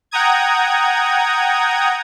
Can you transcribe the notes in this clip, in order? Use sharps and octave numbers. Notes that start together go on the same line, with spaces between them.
F#5 G5 A#5 D#6 G#6